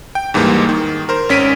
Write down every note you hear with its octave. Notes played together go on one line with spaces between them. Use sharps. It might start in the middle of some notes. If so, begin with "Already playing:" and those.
G5
D#2 G#2 E3 G3 A#3
D#3
A#4 C5
G#1 C#4 B6 D7 D#7